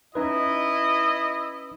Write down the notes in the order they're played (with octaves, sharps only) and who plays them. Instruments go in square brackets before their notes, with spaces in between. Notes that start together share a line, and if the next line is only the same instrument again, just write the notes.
[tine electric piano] C#4 D#4 B4 [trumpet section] E4 D#5